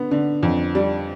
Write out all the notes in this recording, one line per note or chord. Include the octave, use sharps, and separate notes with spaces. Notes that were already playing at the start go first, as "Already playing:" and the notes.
Already playing: D3 B3
D3
F2
G3